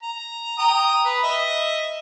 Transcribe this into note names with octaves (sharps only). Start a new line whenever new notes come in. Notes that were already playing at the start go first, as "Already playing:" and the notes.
A#5
G5 A#5 D#6
B4
D#5 E5